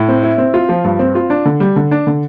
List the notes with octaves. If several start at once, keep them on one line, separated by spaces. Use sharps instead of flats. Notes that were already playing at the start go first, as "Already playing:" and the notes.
Already playing: A2
C4
E4
C4
F4
F3
G2
C4
F4
D4
D3
G3
D3
D4
D3